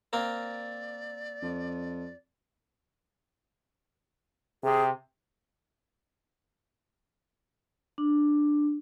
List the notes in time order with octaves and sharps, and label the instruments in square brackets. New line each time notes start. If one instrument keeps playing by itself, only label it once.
[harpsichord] A#3 C4 A#4 [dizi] D5
[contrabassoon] F2
[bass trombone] C3 [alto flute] G#4
[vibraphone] D4